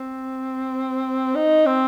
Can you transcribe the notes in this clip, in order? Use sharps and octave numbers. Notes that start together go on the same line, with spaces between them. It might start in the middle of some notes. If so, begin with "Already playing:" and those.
Already playing: C4
D#4
C4